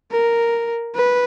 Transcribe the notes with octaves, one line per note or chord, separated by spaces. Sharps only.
A#4
B4